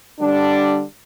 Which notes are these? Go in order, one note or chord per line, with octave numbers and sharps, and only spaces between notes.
D3 G3 D4